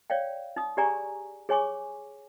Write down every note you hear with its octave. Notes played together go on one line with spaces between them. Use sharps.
C#5 D5 F5 G5
D#4 D#6
G4 G#4 D5 G#5 A#5 C#6
G#4 C#5 G#5 C#6 D6